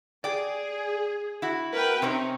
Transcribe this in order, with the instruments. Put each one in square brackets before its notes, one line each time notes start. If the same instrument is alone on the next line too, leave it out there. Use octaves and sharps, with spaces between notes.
[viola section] G#4 [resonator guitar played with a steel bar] D5 G5
[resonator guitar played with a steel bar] E4 F#4
[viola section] A#4 B4 G5
[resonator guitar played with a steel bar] C3 C#4 [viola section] C4 D#4